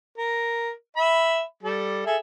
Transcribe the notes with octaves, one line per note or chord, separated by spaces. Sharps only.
A#4
E5 B5
G3 A4
G#4 A4 E5